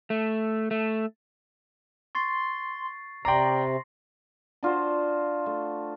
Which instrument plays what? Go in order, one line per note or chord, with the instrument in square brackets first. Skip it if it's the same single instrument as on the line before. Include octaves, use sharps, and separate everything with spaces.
[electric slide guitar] A3
A3
[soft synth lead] C6 [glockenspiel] C#6 A6 C7
[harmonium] C3 [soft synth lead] D5 [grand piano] G5 A#5 [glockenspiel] C6 A#6 C7
[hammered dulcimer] D4 F4 F#4 C5
A3